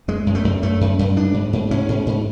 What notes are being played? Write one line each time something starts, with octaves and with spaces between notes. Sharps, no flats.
F#2 G#3
F#2
A3
F#2
F#2 A3
F#2
F#2
G#2 D4
G#2
G#2
G#2 C#4
G#2
G#2